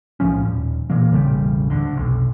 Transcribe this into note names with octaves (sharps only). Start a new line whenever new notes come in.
B1 A2 F3 C#4
D#1
A#2 E3 A#3
E1 A1 C#3 G3
D2 D3
F1 B1